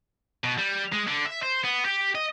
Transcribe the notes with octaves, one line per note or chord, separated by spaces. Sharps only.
B2
G3
G#3
D3
E5
C5
B3
G4
D#5